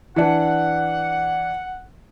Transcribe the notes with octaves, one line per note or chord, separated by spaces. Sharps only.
E3 D4 F#5